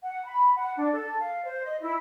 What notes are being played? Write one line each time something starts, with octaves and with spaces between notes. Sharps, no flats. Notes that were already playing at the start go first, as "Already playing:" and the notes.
F#5
B5
F#5
D4
A4
F5
C5
D#5
E4